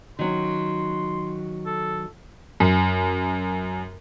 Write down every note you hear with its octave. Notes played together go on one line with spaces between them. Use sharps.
D#3 F#3 C#4 C6
A4
F#2